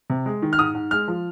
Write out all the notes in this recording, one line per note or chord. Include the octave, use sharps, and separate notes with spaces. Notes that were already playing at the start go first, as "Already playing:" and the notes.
C3
G#3
D#3
F6
G#2 D#6
G#2
G#3 F6
F3